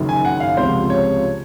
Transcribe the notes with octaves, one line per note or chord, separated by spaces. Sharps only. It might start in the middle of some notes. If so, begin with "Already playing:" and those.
Already playing: F#1 F#2 D#3
G#5
F#5
F5
C#2 C3 F3 C5
C#5